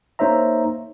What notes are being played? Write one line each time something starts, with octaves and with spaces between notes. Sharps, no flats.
A#3 D#4 C5 C#5 E5 A#5